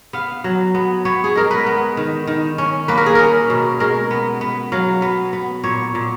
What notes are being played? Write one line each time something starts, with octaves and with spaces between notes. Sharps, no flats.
B3 F5
F#3
B3
B3 C#5
G#4
G#3 A#4
B4
B3
D#3
D#3
C#4
A#3 B4
A#4
G#4
C#4 A#4
B2
G#3 A#4
B3
B3
F#3 F5
B3
B3
A#2 C#5
A#2